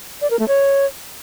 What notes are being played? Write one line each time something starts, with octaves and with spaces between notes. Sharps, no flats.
D5
A#4
A3
C#5